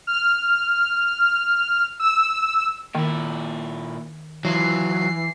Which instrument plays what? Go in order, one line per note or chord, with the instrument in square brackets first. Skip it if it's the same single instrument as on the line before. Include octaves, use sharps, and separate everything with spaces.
[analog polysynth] F6
E6
[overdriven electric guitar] A#2 E4 [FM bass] D#3
[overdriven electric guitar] E3 [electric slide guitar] F#3 F4 [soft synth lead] C7